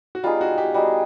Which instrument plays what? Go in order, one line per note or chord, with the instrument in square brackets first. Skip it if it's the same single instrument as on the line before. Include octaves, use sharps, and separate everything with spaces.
[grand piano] F#4
[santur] G3 B3 D#4 G#4 [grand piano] F4
[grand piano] F#4
G4
[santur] G3 B3 D#4 G#4 [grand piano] F#4